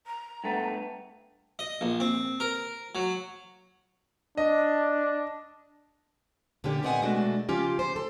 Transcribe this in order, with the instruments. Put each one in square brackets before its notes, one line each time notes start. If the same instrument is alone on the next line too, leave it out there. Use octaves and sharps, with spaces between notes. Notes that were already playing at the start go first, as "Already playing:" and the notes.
[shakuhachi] A#5
[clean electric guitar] G2 A3 B3
[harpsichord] D#5
A#1
C4
A#4
F#3
[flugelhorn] D4 [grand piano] D#5
[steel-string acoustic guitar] A#2 D3 F3 C#4 G4
A#2 B3 C4 D#5 F#5 G#5
B2 G#3 A3 D4 F#4
C#3 F3 C#4 F4 G4 G5
C5
A4